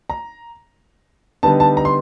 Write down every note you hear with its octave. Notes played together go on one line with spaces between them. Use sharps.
A#5
D3 G3 B3 D#4 A5
A5
A#5
C6